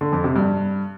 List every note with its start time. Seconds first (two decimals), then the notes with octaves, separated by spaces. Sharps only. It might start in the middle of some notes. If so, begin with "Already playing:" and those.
0.01 D3
0.12 F2
0.24 C3
0.36 G2